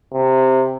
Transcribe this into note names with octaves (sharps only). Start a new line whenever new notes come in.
C3